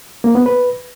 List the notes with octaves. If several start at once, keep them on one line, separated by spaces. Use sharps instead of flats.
A#3
B3
B4